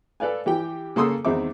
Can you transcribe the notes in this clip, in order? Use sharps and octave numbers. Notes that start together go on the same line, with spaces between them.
A4 B4 D5 F5 G#5
E3 G4 G5
C#3 A#3 A4 C6 D#6 E6
E2 D#3 C4 D#4 E5 D6